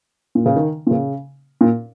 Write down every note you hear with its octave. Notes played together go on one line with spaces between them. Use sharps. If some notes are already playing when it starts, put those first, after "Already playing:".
A#2
C#3
D#3
A#2
C#3
A#2